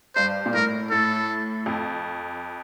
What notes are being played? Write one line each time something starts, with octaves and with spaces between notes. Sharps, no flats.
G2 C5
A#2
A2 A#4
A2 A4
F2